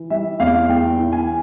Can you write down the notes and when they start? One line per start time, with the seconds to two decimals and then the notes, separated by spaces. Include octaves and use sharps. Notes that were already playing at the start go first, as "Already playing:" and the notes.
Already playing: E3
0.10 G3 E5
0.40 E2 F5
0.69 E2 G5
0.98 E3
1.13 G#5